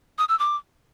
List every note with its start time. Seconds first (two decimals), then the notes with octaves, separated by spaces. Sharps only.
0.18 D#6
0.29 E6
0.39 D6